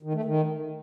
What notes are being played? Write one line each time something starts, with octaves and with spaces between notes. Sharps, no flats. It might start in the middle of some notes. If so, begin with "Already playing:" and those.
D#3
A3
D#3